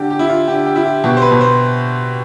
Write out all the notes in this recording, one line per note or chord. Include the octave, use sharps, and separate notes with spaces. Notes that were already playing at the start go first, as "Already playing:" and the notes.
Already playing: D3 G4
G4
E4
F4
D3 G4
G4
E4
G4
B2 G4
C5
B4
B2
C5